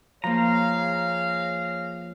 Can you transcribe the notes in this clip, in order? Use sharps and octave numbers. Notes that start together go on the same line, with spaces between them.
F3 A#3 G#4 C#5 F5 A#5